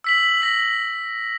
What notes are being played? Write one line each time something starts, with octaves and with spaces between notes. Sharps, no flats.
E6 B6 F#7
A#6 B6